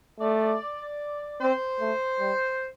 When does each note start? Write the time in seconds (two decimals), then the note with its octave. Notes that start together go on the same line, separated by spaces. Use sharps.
0.20 A3 D5
1.41 C4 C5
1.80 A3
2.20 G3